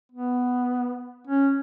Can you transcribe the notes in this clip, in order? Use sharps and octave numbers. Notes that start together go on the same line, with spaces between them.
B3
C#4